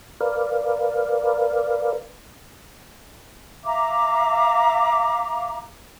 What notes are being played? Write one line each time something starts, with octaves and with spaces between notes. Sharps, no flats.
A#4 B4 D5 F5
E5 F5 A#5 D6